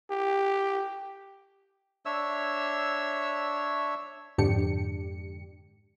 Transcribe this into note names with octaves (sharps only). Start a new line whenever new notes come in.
G4
D4 C#5 E5 E6
F2 G#2 D3 D4 G4 C#7